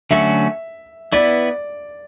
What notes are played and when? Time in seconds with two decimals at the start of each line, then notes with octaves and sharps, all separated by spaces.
0.11 D3 F#3 A3 C#4 F#4 E5
1.12 B3 E4 B4 D5